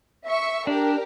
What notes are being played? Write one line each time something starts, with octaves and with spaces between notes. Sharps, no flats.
E5 C#6
D4 G4 A#4